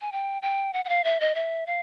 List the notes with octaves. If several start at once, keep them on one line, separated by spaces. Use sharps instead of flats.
G#5
G5
G5
F#5
F#5
F5
E5
D#5
E5
F5